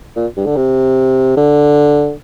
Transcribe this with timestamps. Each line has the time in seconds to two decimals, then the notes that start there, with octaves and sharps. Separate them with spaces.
0.16 A#2
0.37 G2
0.46 D3
0.56 C3
1.37 D3